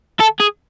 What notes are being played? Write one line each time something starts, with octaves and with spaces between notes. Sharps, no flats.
A4
G#4